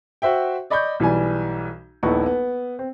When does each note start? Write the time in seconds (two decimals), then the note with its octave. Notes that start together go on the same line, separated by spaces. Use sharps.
0.22 F#4 C5 E5 G5
0.70 D5 D#5 B5 C#6 G6
1.00 B1 E3 G3 G#5
2.03 D#1 A#1 B3 D#4 E4 C#6
2.26 B3
2.79 C4